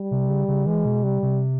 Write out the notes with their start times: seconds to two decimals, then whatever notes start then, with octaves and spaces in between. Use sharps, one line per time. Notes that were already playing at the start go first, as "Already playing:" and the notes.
Already playing: G3
0.11 C3
0.29 C#3
0.48 C#3
0.67 E3 G#3
0.85 B2
1.03 C3 G3
1.23 C3